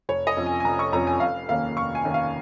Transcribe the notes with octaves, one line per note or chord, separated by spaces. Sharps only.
F1 C#5
D#5
F2 F3 C#4
G#5
G#5
F1 A#5
C#6
F2 F3 C#4 A#5
G#5
F1 F5
D#2 D#3 A#3 C#4 F5
F1 C#6
G#5
D#2 D#3 A#3 C#4
F5